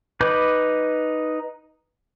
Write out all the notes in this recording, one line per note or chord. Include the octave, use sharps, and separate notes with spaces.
D#4 B4 B5 D6 G6